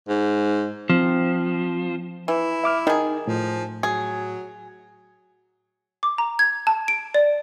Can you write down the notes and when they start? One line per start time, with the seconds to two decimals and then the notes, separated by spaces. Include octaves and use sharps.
0.08 G#2
0.90 F3 C4
2.28 E3 E4
2.64 E5 D6 F6
2.87 D#3 D#4 G#4
3.27 A2 F3
3.83 F#3 G#4
6.03 D6
6.18 A#5
6.39 G#6
6.67 A5
6.88 D7
7.14 D5